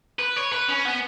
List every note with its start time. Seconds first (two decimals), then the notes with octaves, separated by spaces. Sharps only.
0.19 B4
0.36 C#5
0.52 B4
0.68 C#4
0.85 B3